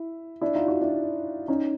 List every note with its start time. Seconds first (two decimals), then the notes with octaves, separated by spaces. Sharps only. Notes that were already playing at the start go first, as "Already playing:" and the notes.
Already playing: E4
0.41 D4 E4
0.55 D#4 F4
0.68 E4 F#4
0.81 D4 E4
1.48 C#4 D#4